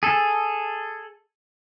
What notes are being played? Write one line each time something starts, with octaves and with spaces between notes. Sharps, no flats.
G#4 A4